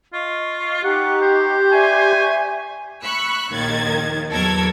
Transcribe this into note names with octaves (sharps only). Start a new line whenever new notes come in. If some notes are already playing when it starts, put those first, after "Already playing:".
F4 D#5 C#6
D#4 G4 F#5 A#5 C#6
C5
D5 E5 G#5 C#6
B5 C#6 E6 F#6
A#1 D#2 D#3 G#6 A6
E2 F#3 A4 A#4 G#6